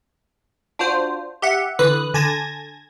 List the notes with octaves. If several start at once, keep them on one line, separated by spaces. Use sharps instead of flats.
D4 F4 F#4 C5
G4 E5 F#5
D3 E3 B4 D#6 F#6
D3 G#5 A5 G#6 A#6